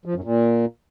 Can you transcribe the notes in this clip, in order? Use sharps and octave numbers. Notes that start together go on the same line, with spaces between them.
F3
F#2
A#2